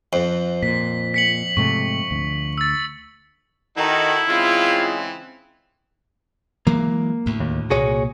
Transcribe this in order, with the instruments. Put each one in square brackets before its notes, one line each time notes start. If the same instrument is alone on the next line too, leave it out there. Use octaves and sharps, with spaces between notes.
[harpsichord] F2 [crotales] C7
[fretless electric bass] A#2 [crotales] B6
[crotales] B6 C#7 F#7
[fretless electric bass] G#2 C3 A3 [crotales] C#6
[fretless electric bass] D2
[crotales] E6 A6
[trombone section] D#3 [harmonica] D#4 F#4 A4 [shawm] E4
[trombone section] C#3 G#3 C4 [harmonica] E3 [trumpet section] F4
[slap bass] E3 F#3 G#3 [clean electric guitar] A#3
[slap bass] D2 A2
[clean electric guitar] D#2
[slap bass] C2 A#2 A#3 [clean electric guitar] F#4 G#4 C#5